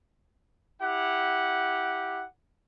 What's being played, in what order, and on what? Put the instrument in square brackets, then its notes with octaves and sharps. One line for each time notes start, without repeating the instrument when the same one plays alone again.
[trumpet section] E4 G4 F#5